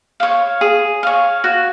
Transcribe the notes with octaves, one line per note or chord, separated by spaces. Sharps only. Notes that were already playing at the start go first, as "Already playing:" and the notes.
C#5 F5
G#4
C#5 F5
F#4